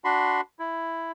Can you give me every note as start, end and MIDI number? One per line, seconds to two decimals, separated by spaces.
0.04 0.41 62
0.04 0.41 66
0.04 0.41 83
0.04 0.41 84
0.59 1.12 64